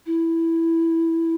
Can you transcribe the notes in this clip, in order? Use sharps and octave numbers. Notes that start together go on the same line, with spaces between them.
E4